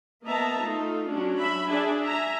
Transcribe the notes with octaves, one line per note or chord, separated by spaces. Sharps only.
A#3 B3 D#5 E5 A5 A#5
A3 D#4 F4
F#3 C#4 D4
E5 B5
D4 G#4 E5 G#5
E5 G#5 A#5